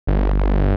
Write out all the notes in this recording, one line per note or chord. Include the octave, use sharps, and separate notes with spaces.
G1